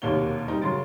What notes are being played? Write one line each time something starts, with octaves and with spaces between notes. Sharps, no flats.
E1 D#2 C3 A#3 C#5 G7
G3 C4 D#4
F#2 C#3 C#4 C6 A6 D7